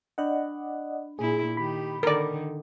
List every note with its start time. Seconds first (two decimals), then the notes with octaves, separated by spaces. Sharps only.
0.18 D4 D5 D#5 F#5 B5 F#7
1.19 A#2 E4 G#4
1.57 D#3 G4 B5
2.03 D3 D#3 A4 A#4 D5